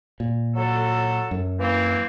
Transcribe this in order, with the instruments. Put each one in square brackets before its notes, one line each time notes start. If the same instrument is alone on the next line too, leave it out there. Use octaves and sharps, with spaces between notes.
[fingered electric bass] A#2
[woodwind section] F#3 A4
[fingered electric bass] F#2
[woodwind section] E3 A#3 C4